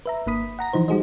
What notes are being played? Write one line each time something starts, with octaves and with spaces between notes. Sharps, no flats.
B4 E5 A#5
G1 A#3 B5 D#6 B6
F#5 A#5 A#6
E3 F3 D#4 C5
G3 D#4 F#4 G#4 C5 D#5